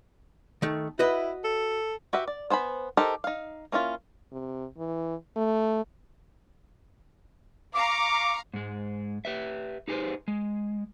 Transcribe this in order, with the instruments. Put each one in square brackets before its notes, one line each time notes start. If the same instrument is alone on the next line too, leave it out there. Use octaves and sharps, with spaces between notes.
[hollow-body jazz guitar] D#3 A3
[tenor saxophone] E4 [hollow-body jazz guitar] F#4 B4 D#5
[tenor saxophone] A4
[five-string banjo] F#4 G4 B4 E5
D5
B3 C5 G#5 B5
D#4 G4 A4 A#4 C5
D#4 F5
A#3 C#4 E4 F4
[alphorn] C3
E3
A3
[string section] F5 A#5 [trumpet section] C#6 D6
[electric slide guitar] G#2 G#3
G4 B4 E5
D#4 G4 G#4 B4 C5
G#3